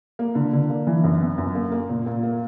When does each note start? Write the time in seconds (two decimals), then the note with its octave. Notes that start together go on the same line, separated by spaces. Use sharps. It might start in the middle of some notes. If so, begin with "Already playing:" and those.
0.19 A#3
0.35 D3
0.53 D3
0.69 A#3
0.87 E3
1.04 F#2
1.21 B3
1.38 F#2
1.55 A#3
1.72 A#3
1.89 A#2
2.06 A#2
2.23 A#3